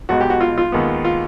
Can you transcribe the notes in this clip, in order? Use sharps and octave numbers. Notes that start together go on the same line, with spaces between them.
B1 B2 G#3 F#4
G4
F#4
F4
F4
D#2 D#3 G#3 B3
F4